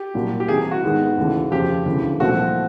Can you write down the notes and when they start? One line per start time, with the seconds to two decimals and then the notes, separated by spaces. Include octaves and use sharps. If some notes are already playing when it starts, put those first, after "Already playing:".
Already playing: G4
0.14 C2 A#2 F#3
0.40 G4
0.48 C2 C3 E3 G#4
0.71 F#4
0.83 G#2 D#3 G#3 B3
1.18 D#2 C#3 E3 A3
1.51 F2 C#3 F3 G4
1.86 E1 D2 C#3 E3
2.20 C2 A#2 F3 A3 C4 F#4